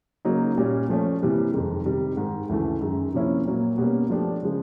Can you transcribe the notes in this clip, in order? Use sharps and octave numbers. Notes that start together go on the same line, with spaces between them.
C#3 F#3 A#3 D#4
A#2 G3 A#3 C#4
F3 A3 C#4
C3 E3 G3 A#3
F2 C3 D#3 G#3
C3 D#3 G3
G#2 D#3 G#3
D2 C#3 E3 A3
F#2 D#3 G#3
C3 F3 A#3 C#4 E4
A#2 F#3 A#3
B2 G3 A#3 C#4
F3 A3 D4 G4
C#3 F3 G#3